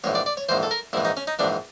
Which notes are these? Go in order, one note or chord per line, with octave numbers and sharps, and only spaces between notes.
A#1 G#2 E3 C#5
D5
D5
C#5
A#1 G#2 E3 C5
A4
A#4
A#1 G#2 E3 E4
D#4
C#4
D#4
A#1 G#2 E3 D4